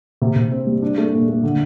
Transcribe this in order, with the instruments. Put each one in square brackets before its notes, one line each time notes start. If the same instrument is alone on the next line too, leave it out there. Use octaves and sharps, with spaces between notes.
[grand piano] C3
C3
C4
G3
D4
A3
A#2
A3
D3